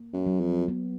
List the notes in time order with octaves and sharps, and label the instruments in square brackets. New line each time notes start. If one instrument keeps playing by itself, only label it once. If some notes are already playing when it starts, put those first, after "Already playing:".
Already playing: [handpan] A#3
[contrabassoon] F#2
[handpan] F#3
[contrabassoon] F2
[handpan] B3